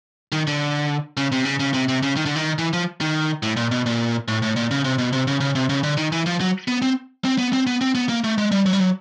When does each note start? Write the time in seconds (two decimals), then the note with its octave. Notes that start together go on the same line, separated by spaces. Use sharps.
0.32 D#3
0.47 D3
1.17 C#3
1.32 C3
1.45 C#3
1.60 C#3
1.74 C3
1.88 C3
2.03 C#3
2.16 D#3
2.26 D3
2.36 D#3
2.58 E3
2.73 F3
3.01 D#3
3.43 A2
3.57 A#2
3.71 B2
3.86 A#2
4.28 A2
4.42 A2
4.56 A#2
4.71 C#3
4.85 C3
4.98 B2
5.13 C3
5.27 C#3
5.41 C#3
5.55 C3
5.69 C#3
5.83 D3
5.97 D#3
6.12 E3
6.26 F3
6.40 F#3
6.68 B3
6.82 C4
7.25 C4
7.38 B3
7.53 C4
7.67 B3
7.81 C4
7.95 B3
8.09 A#3
8.24 A3
8.38 G#3
8.51 G3
8.66 F#3
8.73 G3
8.80 F#3